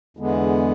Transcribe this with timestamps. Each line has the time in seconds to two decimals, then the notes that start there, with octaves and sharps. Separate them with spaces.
0.17 E2 D3 G#3 B3